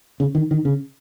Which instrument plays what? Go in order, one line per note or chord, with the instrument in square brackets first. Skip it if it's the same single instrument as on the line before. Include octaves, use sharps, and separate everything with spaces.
[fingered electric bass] C#3
D#3
D#3
C#3